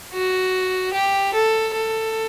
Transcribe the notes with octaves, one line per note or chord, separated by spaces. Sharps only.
F#4
G4
A4
A4